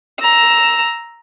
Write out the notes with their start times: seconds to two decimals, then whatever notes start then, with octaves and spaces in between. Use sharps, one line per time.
0.20 A#5 E6